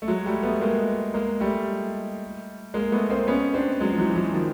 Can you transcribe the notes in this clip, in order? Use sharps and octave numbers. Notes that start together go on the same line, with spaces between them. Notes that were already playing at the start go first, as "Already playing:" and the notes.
A3
F#3 G#3
G3 A3
A3 B3
G#3 A#3
G#3 A#3
G3 A3
G#3 A#3
A3 B3
A#3 C4
B3 C#4
C4 D4
F#3 G#3
F3
E3 F#3
F3
E3 F#3
D#3 F3